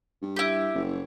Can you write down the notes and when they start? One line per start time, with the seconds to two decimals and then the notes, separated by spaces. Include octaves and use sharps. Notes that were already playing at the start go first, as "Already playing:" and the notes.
0.22 G2
0.36 E4 G4
0.74 F#1